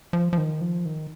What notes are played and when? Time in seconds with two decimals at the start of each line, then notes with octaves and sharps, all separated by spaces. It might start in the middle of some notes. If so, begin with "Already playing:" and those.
0.13 F3
0.33 F3
0.38 D#3
0.61 F3
0.85 D#3